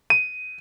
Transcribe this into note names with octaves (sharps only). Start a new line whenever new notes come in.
D#7